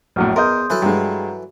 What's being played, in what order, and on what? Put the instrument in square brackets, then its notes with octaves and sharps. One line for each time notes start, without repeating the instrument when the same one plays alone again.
[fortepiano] A#1 F#2 A2 [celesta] F#4 F#5 F6
[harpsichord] E2 [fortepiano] A#4 D#5 [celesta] C6 D#6 G6
[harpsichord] E3 F#3 A4 [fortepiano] B4
[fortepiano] G2 G#3 [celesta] F#5 A#5